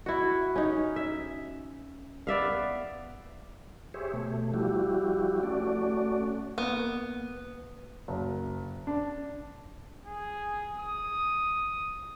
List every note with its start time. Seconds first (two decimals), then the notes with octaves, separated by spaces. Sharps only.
0.06 E4 F#4
0.56 C#4 D#4
0.96 E5
2.27 B3 D5 E5 F5
3.94 G4 G#4 C5 C#5 E5
4.13 B2 A3
4.54 F3 G3 E4 F#4 G4
5.43 A3 C#4 F#4 D5
6.58 A#3 B3
8.08 F#1
8.87 D4
10.06 G#4
10.80 D#6